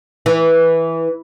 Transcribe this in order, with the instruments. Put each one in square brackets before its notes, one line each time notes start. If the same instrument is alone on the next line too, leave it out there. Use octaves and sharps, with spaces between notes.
[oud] E3